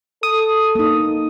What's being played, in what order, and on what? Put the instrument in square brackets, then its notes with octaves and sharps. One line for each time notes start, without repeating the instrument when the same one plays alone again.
[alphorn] A4 [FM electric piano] D#6
[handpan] A#3 D#4